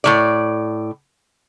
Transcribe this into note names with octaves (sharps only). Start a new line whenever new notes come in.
A2 F3 D5